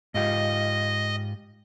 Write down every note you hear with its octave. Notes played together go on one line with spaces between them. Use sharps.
G#2 F4 G4 D#5